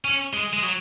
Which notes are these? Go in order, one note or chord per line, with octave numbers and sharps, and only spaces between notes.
C#4
G#3
G#3
F#3